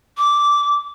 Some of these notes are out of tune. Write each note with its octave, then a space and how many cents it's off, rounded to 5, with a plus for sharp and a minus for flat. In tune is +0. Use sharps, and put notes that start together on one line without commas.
D6 -10